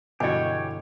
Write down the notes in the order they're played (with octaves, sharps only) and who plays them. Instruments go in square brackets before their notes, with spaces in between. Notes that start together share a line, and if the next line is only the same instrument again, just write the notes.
[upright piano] G1 E3 [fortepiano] B2 [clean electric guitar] G4 C#5 [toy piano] D#5 G#5